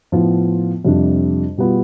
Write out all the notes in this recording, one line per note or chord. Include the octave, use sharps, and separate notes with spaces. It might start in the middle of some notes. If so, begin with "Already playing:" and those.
A2 F3 B3 F4
F2 C3 G3 D4 F4
B2 G3 B3 F4